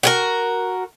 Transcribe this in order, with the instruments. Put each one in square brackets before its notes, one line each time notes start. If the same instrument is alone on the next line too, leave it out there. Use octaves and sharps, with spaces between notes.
[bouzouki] F#4 G#4 A#4